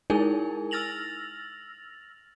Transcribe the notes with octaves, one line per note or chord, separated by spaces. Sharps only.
G#3 D#4 E4 G#4 A#4 G#5
E6 F6 A6 A#6 F7 F#7